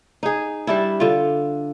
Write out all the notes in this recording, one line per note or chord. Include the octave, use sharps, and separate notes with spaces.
D#4 G#4
G3 D4 E4
D3 F4